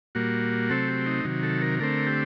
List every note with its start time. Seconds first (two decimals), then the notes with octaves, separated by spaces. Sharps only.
0.15 A#2 G3 A#3 F#4
0.70 C3 F#3 A3 C4 A4
0.88 G4
1.06 D#4
1.25 C3 D#3 F#3
1.43 A4
1.62 A#4
1.80 D3 A3 C4 A#4
2.07 G4